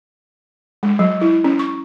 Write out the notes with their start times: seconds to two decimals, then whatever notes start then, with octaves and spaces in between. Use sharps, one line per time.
0.83 G#3
0.99 F#3
1.21 E4
1.44 C#4
1.59 C#6